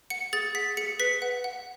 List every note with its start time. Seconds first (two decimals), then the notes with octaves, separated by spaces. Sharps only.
0.10 F#5 C#7
0.33 G#4 A6
0.55 F#5 B6
0.77 G#4 C#7
0.99 B4 B6
1.22 F#5
1.44 F#5